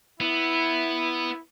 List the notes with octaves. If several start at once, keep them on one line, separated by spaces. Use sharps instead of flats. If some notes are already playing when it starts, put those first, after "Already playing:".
B3 E4